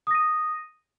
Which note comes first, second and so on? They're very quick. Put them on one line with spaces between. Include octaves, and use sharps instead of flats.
D#6 A#6 D#7